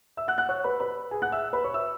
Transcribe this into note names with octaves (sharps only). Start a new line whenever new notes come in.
E5 E6
F#5 F#6
F#5 F#6
C#5 C#6
B4 B5
B4 B5
G#4 G#5
F#5 F#6
E5 E6
B4 B5
C#5 C#6
E5 E6